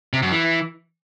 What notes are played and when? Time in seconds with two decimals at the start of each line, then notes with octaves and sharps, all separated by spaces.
0.13 C3
0.23 F#2
0.32 E3